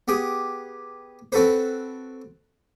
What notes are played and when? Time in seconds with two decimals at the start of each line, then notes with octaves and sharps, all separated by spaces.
0.08 B3 G4 G#4
1.32 C4 F#4 A4 B4 C5